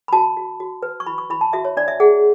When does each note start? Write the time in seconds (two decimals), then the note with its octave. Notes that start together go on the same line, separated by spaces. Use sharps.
0.08 B5
0.13 F#4 A5
0.37 F#4
0.60 F#4
0.83 B4
1.00 C#6
1.06 E4 B5
1.18 C#6
1.30 E4 B5
1.41 A5
1.53 F#4 E5
1.65 C#5
1.77 D4 D5
1.88 E5
2.00 G#4 F#5